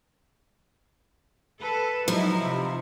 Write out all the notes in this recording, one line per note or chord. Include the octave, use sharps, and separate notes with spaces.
A4 B4
F3 F#3 D#4 E4
C3